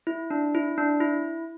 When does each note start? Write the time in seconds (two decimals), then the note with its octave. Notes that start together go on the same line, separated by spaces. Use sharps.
0.07 E4
0.30 D4
0.55 E4
0.78 D4
1.00 E4